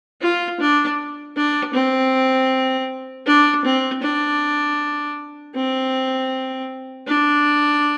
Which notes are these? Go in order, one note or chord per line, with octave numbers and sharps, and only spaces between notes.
F4
D4
D4
C4
D4
C4
D4
C4
D4